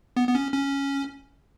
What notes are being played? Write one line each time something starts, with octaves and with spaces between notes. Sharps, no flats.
B3
B3
C#4
C#4